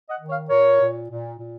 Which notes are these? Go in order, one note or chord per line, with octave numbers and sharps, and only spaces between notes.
D#5 F#5
D#3
C#5 F5
A#2 A#4 C#5
A#2
A#2
A#2